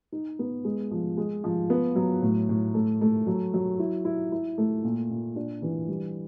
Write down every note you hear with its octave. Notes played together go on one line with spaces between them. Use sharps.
D#4
B3
G#3
F3
G#3
F3
B3
F#3
A2
A2
A3
A3
F#3
F#3
E4
E4
E4
A3
A#2
A#2
D4
E3
G3